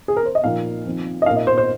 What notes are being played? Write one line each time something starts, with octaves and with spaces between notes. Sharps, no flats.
G#4
A#4
C5
D#5
A#2 F3 A#3 D#4 F5
F3 C4 D#4
D#5
A#2 A#3 D#4 F5
D#5
C5
C5